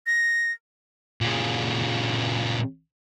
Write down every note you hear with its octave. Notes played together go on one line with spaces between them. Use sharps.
A#6
A#2 C#3